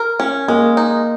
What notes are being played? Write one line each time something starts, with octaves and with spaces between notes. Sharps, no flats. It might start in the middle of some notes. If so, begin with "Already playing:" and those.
Already playing: A#4
C#4
G#3 A#3
D#4